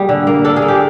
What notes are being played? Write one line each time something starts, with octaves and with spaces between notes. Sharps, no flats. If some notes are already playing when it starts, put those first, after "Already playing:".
Already playing: G3 A#3 G#4
D3
A#3
D4 A4
G#4
A#3
G4